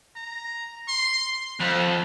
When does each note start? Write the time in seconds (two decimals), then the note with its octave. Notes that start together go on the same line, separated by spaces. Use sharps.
0.16 A#5
0.88 C6
1.60 F2 F#5